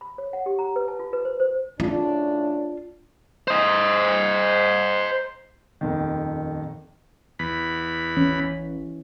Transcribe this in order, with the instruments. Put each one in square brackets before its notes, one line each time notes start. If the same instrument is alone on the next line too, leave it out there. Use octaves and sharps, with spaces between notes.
[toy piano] B5
C#5
F#5
G4
A#5
B4
A5
F4
B4
C5
C5
[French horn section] A2 C#3 D4 [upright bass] F4
[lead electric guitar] C5 D#5
[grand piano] D#1 F2 D#3
[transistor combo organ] E2 B5
[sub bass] A1 [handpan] E3 C#4